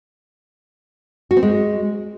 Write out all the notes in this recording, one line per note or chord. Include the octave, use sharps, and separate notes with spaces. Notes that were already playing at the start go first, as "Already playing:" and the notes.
F#4
C4
G#3